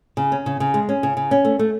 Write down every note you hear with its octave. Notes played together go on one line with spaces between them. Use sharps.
C#3
C#4
C#3
C#3
G#3
C#4
C#3
C#3
C#4
A3
A3